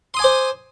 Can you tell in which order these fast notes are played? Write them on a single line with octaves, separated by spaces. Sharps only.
C6 D#6 G#5 D6 C5